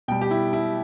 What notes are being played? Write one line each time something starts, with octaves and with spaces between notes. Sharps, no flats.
B2 G3 G5
G4
E4
E4